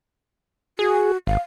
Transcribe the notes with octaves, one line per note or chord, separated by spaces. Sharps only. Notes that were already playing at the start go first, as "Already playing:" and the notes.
F#4 G#4
G#1 F5